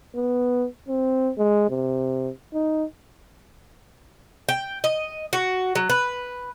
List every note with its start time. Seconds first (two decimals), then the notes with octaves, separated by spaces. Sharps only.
0.15 B3
0.89 C4
1.38 G#3
1.69 C3
2.54 D#4
4.49 G5
4.84 D#5
5.33 F#4
5.75 F#3
5.90 B4